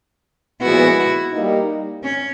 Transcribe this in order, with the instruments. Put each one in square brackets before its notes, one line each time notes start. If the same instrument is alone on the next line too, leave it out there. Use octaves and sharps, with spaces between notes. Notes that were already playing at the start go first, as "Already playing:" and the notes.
[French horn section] A#2 F3 G#3 B3 [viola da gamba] E4 F#4
[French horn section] G3 A#3 D#4
[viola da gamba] C#4